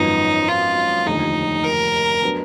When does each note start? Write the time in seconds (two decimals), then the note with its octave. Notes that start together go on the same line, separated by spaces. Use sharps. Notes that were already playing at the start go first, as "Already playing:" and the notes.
Already playing: G#1 F#2 F3 B3 D#4
0.48 F4
1.06 F1 D#2 D3 F3 D#4
1.64 A#4
2.22 F#3 B3 D4